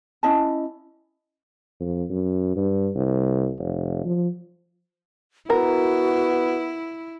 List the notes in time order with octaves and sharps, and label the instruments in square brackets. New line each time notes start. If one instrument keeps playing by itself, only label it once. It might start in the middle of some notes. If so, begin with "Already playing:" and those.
[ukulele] C#4 E4 D#5 A5
[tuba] F2
F#2
G2
C2
F1
F3
[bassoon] B3 [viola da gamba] E4 [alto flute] F#4 [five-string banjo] A#4